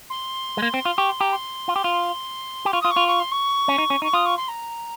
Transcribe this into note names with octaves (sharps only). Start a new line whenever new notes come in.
C6
G#3
A#3
C4
F4
G4 C#6
C6
G4 A#5
C6
F4
G4
F4
G4
F4 C#6
D#6
F4
C#6
F4
C#6
C6
C#6
C#4
D#4
C#4
D#4 C#6
F4 D#6
C#6
C6
A#5